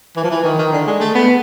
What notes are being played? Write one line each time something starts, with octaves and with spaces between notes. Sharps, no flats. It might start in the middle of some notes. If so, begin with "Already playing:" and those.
E3
F3
E3
D#3
D#3
D3
G#3
A3
B3